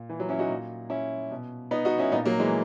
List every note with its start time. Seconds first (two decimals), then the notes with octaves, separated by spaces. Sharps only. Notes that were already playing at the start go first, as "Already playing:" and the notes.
Already playing: A#2
0.09 E3
0.20 F#3
0.29 C#4 E4
0.39 D#4 F#4
0.50 A#2
0.90 C#4 E4
1.31 B2
1.71 B3 D#4
1.85 D#4 F#4
1.98 C#4 E4
2.12 A#2 B3 D#4
2.26 F#3 A#3
2.39 E3 G#3